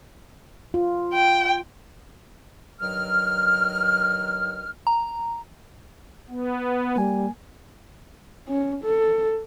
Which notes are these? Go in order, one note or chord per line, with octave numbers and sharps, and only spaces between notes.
F4
G5
G2 D#3 F#3 F6
A#5
B3
G3 A#3 G#5
C#4
A4